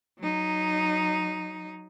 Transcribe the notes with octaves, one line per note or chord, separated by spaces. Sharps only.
F#3 D#4